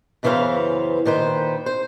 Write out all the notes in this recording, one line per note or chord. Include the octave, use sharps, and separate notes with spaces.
F#2 C#3 E3 B3 C5 F5
A#2 D#3 B4 C5
C5